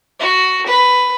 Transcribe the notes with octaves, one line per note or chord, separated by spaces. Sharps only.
F#4
B4